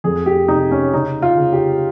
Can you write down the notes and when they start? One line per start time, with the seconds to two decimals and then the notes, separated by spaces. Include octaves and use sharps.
0.04 F2 G#4
0.26 G4
0.48 C3 D#4
0.71 C#4
0.94 C#3 D#4
1.22 F4
1.37 C#3
1.52 G4